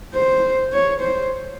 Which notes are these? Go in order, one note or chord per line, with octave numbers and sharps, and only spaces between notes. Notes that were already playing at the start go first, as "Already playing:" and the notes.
C5
C#5
C5